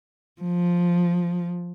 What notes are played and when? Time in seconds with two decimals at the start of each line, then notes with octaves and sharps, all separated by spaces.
0.42 F3